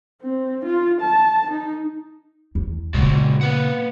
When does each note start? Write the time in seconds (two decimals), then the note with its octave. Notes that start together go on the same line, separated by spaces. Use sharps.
0.21 C4
0.65 F4
1.01 A5
1.51 D#4
2.55 E2
2.94 A#2 C#3 G#3 F#4 D5
3.41 A#3 B4 F#5